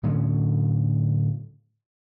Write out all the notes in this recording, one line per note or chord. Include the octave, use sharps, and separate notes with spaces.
A2 D3 F#3 C#4